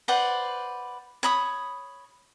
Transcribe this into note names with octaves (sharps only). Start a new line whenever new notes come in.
B4 C5 D5 F#5
C#5 B5 D#6